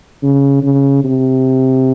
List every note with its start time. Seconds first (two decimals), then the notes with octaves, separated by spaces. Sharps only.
0.23 C#3
0.63 C#3
1.04 C3